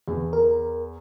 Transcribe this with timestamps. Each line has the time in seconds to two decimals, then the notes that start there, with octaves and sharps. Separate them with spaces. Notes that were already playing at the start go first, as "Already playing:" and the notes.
0.08 E2
0.33 A#4